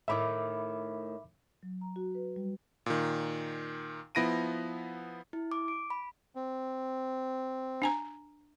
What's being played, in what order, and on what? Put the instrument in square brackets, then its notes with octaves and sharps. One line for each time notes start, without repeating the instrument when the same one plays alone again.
[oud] A2 D#3 E4 [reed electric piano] E5 B5 D6
[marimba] F#3
A#5
F#4
B4
G3
[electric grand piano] A#2 D#3
F3 B3 E4 A#6 D7 D#7
[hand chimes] E4
D6
D7
B5
[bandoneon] C4
[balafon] D4 G#5 A#5